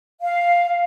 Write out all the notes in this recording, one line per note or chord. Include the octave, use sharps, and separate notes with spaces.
F5